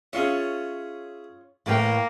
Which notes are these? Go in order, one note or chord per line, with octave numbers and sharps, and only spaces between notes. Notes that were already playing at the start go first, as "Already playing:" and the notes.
C#4 F4 G#4 C#5 E5
A2 E3 A3 A#3 B4 G5